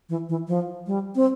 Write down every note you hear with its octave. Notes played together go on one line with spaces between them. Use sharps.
E3
E3
F3
G3
C4